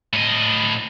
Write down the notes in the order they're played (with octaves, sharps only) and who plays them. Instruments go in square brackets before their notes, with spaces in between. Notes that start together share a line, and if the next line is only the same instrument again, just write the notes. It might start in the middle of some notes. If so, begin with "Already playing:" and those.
[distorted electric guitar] A2 D#5